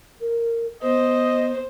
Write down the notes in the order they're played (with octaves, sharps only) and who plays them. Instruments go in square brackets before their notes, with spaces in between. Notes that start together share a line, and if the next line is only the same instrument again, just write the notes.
[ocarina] A#4
[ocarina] B3 [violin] C5 [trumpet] D#5